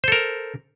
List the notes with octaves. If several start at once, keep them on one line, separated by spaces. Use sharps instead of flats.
A4 A#4 C5